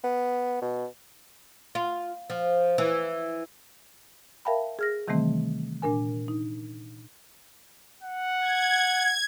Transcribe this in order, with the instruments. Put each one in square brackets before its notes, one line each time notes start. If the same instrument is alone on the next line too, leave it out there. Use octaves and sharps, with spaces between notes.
[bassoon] B3
B2
[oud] F4
F3
E3
[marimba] A#4 E5 F5 G5 A5 B5
G#4 F6 A#6
C3 D#3 E3 G3 A3 C4
A#2 D4 A#4 G#5
D#4
[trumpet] F#5
[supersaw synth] G#6